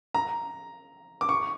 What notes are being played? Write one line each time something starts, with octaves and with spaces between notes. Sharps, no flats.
A#5
D6
C#6